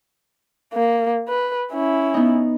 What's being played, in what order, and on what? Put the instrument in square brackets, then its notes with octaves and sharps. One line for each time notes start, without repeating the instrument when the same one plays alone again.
[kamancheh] A#3
B4
C#4 E4
[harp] B3 D#4